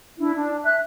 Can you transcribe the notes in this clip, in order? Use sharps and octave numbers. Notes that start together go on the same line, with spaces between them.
D4 E4
D4
E5 F#6